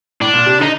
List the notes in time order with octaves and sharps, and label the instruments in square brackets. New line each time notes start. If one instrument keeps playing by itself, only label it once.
[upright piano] A2 [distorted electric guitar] D4
[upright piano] A#2
C3
D3
[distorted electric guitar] D#4